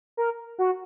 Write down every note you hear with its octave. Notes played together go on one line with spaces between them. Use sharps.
A#4
F#4